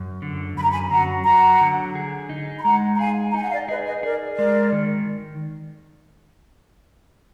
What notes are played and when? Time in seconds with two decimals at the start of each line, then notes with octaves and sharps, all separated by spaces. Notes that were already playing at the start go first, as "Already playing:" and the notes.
Already playing: F#2
0.22 D3
0.56 F#2 B5
0.64 A#5
0.71 G#5 B5
0.91 F#3 F#5 A#5
1.26 F#3 F#5 A#5
1.61 D3
1.95 G#4
2.29 D#4
2.58 B5
2.64 G#3 F#5 A#5
2.94 A#5
2.99 G#4 F5 G#5
3.29 A#5
3.34 D#4 G#5
3.43 F#5
3.51 D5 F5
3.69 G#4 B4 D#5
3.86 B4 D#5
4.03 G#4 A#4 D5
4.37 G#3 A#4 D5
4.72 D#3